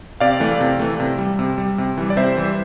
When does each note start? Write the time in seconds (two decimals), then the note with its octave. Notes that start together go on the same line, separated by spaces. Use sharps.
0.20 C3 D5 F5
0.40 E3 A3
0.60 C3
0.79 E3 A3
1.00 C3
1.18 G3
1.39 C3
1.58 G3
1.78 C3
1.97 E3 G3
2.10 D5
2.17 C3 C5 E5
2.37 E3 G3